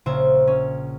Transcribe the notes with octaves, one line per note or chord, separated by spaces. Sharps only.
A#1 C#3 C5 E5
C#4